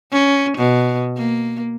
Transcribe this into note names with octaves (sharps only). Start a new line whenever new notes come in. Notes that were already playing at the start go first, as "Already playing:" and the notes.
C#4
B2
A#3